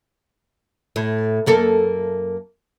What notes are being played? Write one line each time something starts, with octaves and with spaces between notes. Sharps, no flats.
A2
F#2 A#3 A4